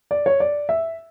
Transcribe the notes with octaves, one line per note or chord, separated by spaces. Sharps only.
D5
C#5
D5
E5